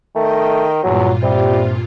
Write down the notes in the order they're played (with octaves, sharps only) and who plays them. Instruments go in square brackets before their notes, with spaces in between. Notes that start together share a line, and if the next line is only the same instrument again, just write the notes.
[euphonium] D#3 [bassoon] A3 [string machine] D#5 G5
[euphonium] E2 [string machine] G2 A#2 F4 [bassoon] F#3
[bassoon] C3 [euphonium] G3